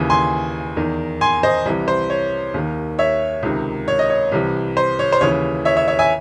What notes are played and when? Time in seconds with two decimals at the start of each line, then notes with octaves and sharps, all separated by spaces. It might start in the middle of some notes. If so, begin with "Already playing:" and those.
Already playing: D#2 C#3 E3
0.10 G#5 C6
0.77 E2 D#3
1.21 G#5 C6
1.43 C5 D#5
1.66 C2 C3 E3
1.88 C5
2.10 C#5
2.54 D#2 D#3
2.99 C#5 E5
3.43 C#2 C3 D#3
3.88 C#5
3.99 D#5
4.10 C#5
4.32 C2 C3 E3
4.77 C5
4.99 C#5
5.12 C5
5.21 D#2 C#3 E3 C#5
5.65 C#5 E5
5.77 C#5 E5
5.88 C#5 E5
5.99 E5 G#5